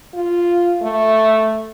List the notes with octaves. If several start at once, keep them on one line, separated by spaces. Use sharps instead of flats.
F4
A3